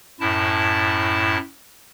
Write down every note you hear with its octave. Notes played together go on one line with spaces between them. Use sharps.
F#2 A2 E4 A5